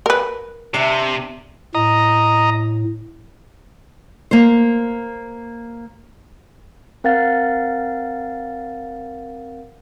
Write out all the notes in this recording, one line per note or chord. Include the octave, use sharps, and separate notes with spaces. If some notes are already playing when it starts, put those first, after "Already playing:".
A#4 B4
C3 D4 E5
A2 D#5 A#5
A#3 C5
C4 A#4 F5 F#5 A6